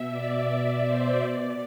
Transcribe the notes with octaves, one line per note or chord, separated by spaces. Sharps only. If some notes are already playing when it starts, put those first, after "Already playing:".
Already playing: B2 E5
D5
E5
C5
B2 D5